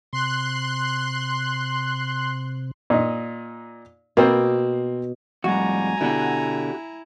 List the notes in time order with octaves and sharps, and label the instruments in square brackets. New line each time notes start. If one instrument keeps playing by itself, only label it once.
[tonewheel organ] C3 [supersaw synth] C6 F#6
[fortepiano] A#2 D#4
[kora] B2 [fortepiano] A#3 C4 C5
[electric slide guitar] F2 A2 G#3 [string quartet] G3 [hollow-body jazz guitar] F#4 [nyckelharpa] G#5 A#5
[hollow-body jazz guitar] B2 D3 [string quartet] E4 [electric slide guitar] F#4 G4 F#5